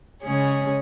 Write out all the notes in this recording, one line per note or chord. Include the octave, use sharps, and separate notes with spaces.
C#3 G#3 C#4 G#4 C#5